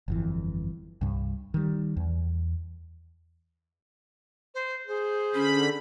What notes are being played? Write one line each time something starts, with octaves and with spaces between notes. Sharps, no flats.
G1 F2 E3
C2 G2
D#3 G3
E2
C5
G#4 C5
D3 C#4 B5